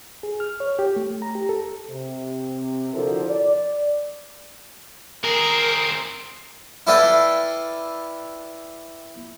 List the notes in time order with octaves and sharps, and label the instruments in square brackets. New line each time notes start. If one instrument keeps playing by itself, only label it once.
[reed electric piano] G#4
F6
C#5
G4
A3
A#5
G4
A4
[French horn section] C3
D3 F3 E4 F#4 A4 A#4
D5
[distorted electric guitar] C4 G#4 [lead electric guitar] A#4
[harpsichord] E4 A4 B4 D5 F5 G5